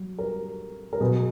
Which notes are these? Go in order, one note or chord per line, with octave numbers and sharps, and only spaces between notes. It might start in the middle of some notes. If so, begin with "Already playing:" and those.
Already playing: F#3
A#4
A#4
B2 F#3 B3 G#4